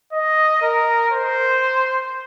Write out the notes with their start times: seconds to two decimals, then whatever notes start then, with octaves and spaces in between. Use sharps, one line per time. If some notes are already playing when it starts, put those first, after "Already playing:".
0.13 D#5
0.62 A#4
1.12 C5